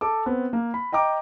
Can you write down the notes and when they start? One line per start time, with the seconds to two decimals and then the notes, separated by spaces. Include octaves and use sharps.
0.01 A4 D6
0.26 B3 C4
0.53 A#3
0.74 B5
0.92 D#5 G5 A#5 D6